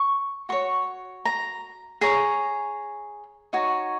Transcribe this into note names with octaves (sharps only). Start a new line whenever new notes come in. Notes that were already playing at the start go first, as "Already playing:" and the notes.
Already playing: C#6
F#4 C#5 C#6
A#5
G#4 C#5 A#5
D#4 F#4 C#5